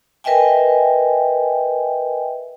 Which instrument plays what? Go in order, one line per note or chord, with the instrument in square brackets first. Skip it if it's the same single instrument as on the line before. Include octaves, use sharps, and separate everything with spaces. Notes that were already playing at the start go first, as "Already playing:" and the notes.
[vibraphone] A#4 B4 D#5 E5 G5 G#5